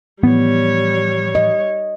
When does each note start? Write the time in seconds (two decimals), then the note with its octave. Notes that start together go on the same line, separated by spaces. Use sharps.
0.23 A2 E3 F3 G3 B3 C#5
1.35 D#5